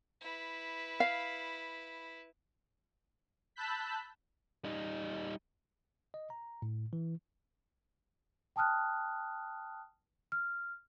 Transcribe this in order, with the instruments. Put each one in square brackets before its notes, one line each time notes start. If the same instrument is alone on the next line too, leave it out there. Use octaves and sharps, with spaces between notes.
[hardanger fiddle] E4 B4
[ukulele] F5
[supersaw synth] A5 B5 E6 F#6 G6 B6
[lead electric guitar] G3 D#4
[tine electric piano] D#5
A#5
A2
E3
[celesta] G5 A5 D#6 F6 F#6
F6